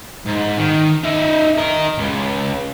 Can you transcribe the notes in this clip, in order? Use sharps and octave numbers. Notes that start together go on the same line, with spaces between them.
G#2
D#3
D#4 E5
A#4 D#5
C#2